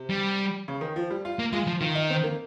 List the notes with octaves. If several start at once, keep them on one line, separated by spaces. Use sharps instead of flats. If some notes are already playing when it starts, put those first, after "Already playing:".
Already playing: C3
G3
C#3
D#3
F3
G3
F4
A#3
G#3 F4
F3
D#3 F4
D#4
C4
A#3